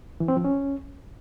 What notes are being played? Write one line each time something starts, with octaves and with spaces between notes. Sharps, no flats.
E3
C4
F3
C#4